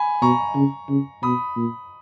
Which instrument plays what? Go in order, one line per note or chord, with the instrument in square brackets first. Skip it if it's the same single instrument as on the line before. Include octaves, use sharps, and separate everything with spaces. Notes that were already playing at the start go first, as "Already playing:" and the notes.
Already playing: [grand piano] G#5 B5
[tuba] B2 [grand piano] A#5 C#6
[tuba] C#3
C#3
[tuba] B2 [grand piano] B5 D#6
[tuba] A#2